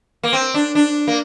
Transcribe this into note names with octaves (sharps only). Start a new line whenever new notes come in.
A#3
C4
D4
D4
A#3